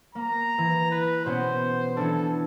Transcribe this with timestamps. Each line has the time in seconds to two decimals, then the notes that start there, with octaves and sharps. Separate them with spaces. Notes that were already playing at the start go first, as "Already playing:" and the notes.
0.15 A#3 A#5
0.58 E3
0.91 B4
1.26 B2 B3 C#4 C5
1.97 E3 C#4 D4 A4